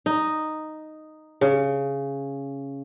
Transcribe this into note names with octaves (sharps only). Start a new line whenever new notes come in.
D#4
C#3